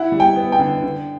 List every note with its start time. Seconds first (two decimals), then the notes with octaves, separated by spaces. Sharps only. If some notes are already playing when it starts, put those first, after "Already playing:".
Already playing: E4 F#5
0.12 G3
0.20 G5
0.36 B3
0.52 G5
0.59 D3
0.83 D3